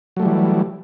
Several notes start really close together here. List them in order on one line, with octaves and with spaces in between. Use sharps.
F#3 A3 G3 E3